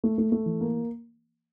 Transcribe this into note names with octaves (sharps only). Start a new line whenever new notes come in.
A3
A3
A3
E3
A#3